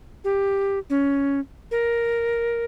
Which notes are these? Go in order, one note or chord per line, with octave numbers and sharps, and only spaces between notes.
G4
C#4
A#4